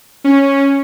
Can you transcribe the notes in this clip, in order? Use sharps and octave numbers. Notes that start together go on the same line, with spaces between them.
C#4